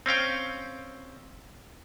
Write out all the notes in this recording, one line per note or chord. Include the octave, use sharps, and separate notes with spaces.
C4 C#4 F5 G5